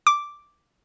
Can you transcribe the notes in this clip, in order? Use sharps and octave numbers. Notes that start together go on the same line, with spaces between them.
D6